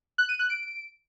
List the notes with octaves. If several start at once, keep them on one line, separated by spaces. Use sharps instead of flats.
F#6
D#7
F#6
D7